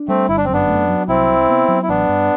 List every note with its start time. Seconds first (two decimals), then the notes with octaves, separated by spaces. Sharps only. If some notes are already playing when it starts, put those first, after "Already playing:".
Already playing: D4
0.08 G3 A3 C4
0.28 G1 E4
0.37 D4
0.45 C4
0.49 F#2 B3 D4
0.68 A3
0.89 F#3
1.08 C2 C4 E4
1.29 C3
1.49 B3
1.68 F#3
1.83 E4
1.89 A1 B3 D4
2.09 G2